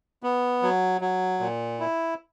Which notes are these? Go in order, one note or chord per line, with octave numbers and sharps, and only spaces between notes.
B3
F#3
F#3
A#2
E4